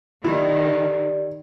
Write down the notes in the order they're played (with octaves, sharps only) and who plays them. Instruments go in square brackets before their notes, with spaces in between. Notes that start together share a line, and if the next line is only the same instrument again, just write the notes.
[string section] D#3 [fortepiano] E4 [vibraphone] G4 A#4 D5